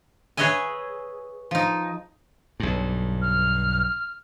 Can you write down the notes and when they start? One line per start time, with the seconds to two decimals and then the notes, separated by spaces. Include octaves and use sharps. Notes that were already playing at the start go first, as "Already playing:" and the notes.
0.37 G#4 B4 C#5 D#5 E5 G#5
1.51 F3 D#4
2.60 B1 G2
3.22 F6